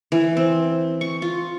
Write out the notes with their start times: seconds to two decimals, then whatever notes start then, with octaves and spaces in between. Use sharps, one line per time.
0.12 E3
0.37 C4
1.01 C#6
1.22 F4